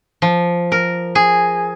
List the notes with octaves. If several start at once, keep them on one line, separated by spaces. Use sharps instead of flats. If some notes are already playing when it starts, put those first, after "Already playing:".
F3
A#4
G#4